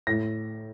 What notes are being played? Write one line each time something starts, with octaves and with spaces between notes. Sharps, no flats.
A2 A#6